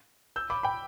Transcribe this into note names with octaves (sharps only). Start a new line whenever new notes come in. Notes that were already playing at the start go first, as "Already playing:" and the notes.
E6 G6
B5 D6
G5 B5